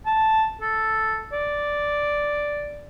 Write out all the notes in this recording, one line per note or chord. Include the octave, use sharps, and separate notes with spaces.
A5
A4
D5